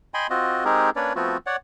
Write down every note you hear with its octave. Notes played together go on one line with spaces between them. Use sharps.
D#5 G5 G#5 B5 C6
C4 F4 F#4 D#5
G#3 C4 D#4 G4 G#4 A#4
A#3 C#4 D4 B4 C#5 D5
F3 A3 B3 C4 F4 F#4
C#5 D5 F#5